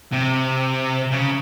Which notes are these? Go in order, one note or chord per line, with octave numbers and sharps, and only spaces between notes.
C3
C#3